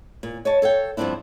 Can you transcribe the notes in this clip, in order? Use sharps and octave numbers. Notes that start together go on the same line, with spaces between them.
A#2
C#5 D#5 A5
A4 C#5 F5 G5
G2 F3 G#3 C4 D4 E4